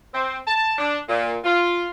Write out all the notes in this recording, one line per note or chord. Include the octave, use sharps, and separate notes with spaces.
C4
A5
D4
A#2
F4